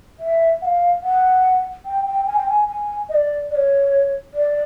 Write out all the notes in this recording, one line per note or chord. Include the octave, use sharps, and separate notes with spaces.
E5
F#5
F5
F#5
G5
G5
G#5
G5
G#5
G#5
D#5
D5
D5
C#5
D5